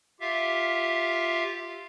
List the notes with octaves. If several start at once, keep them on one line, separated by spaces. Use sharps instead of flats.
F4 G4 E5 F5